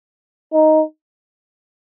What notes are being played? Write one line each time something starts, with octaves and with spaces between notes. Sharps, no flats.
D#4